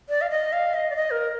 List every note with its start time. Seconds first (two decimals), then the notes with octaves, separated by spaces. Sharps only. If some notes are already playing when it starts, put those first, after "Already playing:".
0.09 D5
0.21 F5
0.30 D#5
0.53 F5
0.74 D#5
0.90 D5
0.96 D#5
1.11 A#4